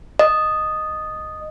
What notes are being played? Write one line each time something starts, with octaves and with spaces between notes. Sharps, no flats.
D#5